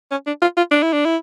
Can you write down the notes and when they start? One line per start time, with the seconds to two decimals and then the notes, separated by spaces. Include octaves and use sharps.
0.11 C#4
0.27 D4
0.42 F4
0.57 F4
0.71 D4
0.83 E4
0.93 D4
1.05 E4